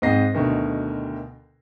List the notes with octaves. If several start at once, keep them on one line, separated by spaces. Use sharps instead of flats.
G#2 C4 D#5 A#6 C7
D2 B2 D3 D#3